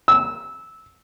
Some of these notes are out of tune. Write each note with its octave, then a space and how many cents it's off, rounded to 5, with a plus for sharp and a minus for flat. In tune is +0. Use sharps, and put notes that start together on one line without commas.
E6 -15